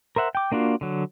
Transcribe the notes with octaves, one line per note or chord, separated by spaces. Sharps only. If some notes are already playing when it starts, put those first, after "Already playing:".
A#4 C5 E5 F#5
G5 D6
A#3 D4 F4 F#4
D3 F#3